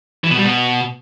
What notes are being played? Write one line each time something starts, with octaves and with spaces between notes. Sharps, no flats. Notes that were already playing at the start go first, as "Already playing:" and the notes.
E3
B2
G3
B2